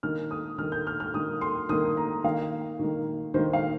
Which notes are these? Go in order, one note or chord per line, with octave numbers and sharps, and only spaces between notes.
D#3 A#3 F6
D#6
D#3 A#3 F6
G6
F6
F6
D#3 A#3 D#6
C6
D#3 A#3 D#6
A#5
D#3 A#3 F5
D#3 A#3
D#3 A#3 C5
F5